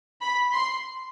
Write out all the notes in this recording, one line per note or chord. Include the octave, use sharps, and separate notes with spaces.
B5
C6